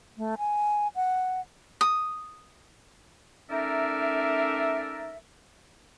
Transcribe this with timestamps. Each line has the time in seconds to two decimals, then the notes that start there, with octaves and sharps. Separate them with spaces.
0.17 A3
0.38 G#5
0.95 F#5
1.81 D#6
3.50 A3 C#4 D#4 A#4 D5 E5